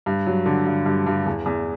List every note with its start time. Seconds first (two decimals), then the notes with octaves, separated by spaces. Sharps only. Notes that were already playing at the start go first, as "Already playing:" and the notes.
0.06 G2
0.27 F#3
0.46 D3
0.66 G2
0.86 G2
1.07 G2
1.26 E2
1.46 E2